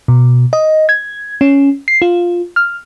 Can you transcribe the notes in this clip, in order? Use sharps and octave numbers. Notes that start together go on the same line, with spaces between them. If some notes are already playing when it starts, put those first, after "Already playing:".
B2
D#5
G#6
C#4
C7
F4
F6